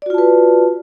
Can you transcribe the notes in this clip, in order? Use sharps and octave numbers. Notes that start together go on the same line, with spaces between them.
F4 F#4 B4 D5 A5